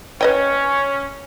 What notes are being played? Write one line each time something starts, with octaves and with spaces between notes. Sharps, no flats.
C#4 B4 D#5 G5